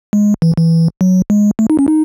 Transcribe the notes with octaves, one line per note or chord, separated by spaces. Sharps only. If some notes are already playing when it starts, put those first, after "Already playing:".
G#3
E3
E3
F#3
G#3
A3
D#4
C#4
D#4